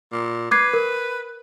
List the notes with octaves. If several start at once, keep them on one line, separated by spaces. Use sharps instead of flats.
A#2
B4 D6 G#6 C7
A#4